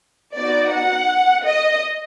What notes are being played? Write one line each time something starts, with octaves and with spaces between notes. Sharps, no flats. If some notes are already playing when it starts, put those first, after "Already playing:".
B3 D#4 F#4 D5
F#5
D#5